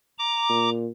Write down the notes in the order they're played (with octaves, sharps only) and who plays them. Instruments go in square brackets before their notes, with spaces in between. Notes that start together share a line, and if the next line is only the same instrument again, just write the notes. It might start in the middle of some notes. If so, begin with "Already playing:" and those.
[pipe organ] A#5 D6
[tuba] A#2